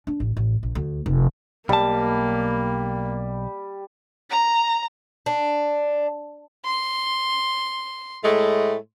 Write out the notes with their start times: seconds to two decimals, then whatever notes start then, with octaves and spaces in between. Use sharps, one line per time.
0.07 D4
0.20 A1
0.37 A1
0.63 A#1
0.75 D2
1.06 F1
1.69 B1 G3 A#3 A5
4.30 A#5
5.26 D4
6.65 C6
8.24 A2 G#3 A3